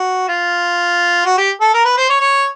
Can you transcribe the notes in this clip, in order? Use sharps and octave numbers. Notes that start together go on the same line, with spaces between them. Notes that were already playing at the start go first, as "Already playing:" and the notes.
Already playing: F#4
F4
F#4
G4
A4
A#4
B4
C5
C#5
C#5